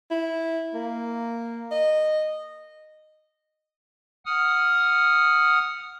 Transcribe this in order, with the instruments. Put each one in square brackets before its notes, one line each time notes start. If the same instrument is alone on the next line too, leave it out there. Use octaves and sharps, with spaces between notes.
[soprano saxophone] E4
A#3
D#5
[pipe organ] F#5 D#6 F6